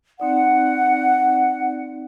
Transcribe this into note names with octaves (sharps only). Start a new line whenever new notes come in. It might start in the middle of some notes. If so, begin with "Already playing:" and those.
C4 D#4 D5 F#5